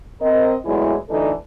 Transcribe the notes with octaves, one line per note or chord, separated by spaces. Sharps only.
C4 A#4 D#5
E2 A2 E3 F#3 G#3 E4
D2 E3 D4 D#4 A4